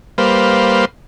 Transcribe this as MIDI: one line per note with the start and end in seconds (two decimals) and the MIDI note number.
0.18 0.85 55
0.18 0.85 58
0.18 0.85 71
0.18 0.85 72
0.18 0.85 77